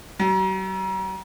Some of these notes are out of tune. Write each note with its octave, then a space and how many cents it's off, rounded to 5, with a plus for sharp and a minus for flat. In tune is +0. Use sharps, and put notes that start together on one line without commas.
F#3 +45